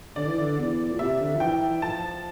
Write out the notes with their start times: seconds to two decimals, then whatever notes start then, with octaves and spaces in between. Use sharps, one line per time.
0.16 D3 D5
0.27 E3
0.39 D3
0.58 E2
0.91 A#2
0.99 C3 E5
1.20 D3
1.35 F3
1.40 E3 G5
1.62 E3
1.82 F3 A5